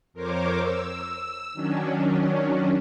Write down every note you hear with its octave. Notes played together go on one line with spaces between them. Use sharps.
F2 A#4 C5 C#5 D6
E6
D#3 F#3 C#4 D4